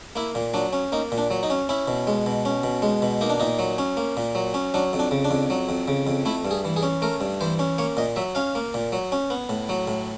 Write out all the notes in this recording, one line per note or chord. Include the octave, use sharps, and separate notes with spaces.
A#3 E4
A#2
F#3 D4
C#4
A#3 D#4
A#2
D4
F#3
D#4
C#4
C#4 E4
B2
G#3
B2
C#4
B2
G#3
B2
A#3 D#4
D4
A#2 D#4
F#3
C#4
A#3
A#2
F#3
C#4
F#3 D4
F2
D4
C#3
D4
F2
F#3
F2
C#3
F2
A3 E4
G2
G#4
E3
G#4
C#4
A3 A#4
G2
E3 C5
C#4
A#3 C#5
A#2 D#5
F#3 E5
C#4 F5
A#3
A#2
F#3
C#4
B3
A2
F#3
A2